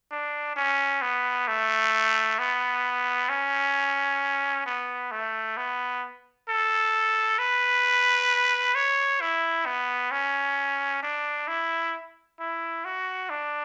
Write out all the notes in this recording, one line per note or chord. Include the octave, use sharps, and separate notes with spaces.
D4
C#4
B3
A3
B3
C#4
B3
A3
B3
A4
B4
C#5
E4
B3
C#4
D4
E4
E4
F#4
D4